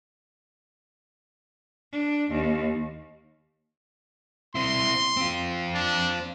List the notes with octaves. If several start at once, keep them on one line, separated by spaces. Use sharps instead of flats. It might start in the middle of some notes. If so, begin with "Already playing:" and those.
D4
D#2
C4 E4 C6
C4 F4
D4